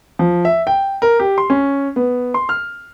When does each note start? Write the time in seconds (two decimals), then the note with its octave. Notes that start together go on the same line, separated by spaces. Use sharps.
0.19 F3
0.45 E5
0.67 G5
1.02 A#4
1.19 G4
1.38 C6
1.50 C#4
1.96 B3
2.34 C6
2.49 F6